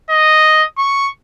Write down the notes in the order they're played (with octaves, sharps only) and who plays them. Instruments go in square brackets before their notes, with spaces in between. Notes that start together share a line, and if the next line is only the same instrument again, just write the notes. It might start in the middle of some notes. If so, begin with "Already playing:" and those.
[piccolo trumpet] D#5
C#6